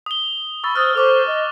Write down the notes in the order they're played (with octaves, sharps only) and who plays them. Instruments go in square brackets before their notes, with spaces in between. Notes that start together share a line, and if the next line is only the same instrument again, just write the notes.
[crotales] D#6 G7
[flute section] B5 [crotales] C#6 E6 A6
[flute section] C5 D#6 [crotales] F6 F#6 A6
[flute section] A4 C5 [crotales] C#6 D6 F7
[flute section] D#5